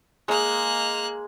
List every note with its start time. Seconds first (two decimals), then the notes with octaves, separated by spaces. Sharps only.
0.28 G#3 A#3 F#6